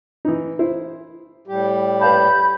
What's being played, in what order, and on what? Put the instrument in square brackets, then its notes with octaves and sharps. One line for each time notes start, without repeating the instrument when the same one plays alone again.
[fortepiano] E3 D#4
E4 C5
[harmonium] A2 G3 G4
[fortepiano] B4 F5 A5 [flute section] B5 G6